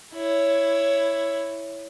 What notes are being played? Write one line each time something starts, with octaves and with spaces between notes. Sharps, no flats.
E4 C#5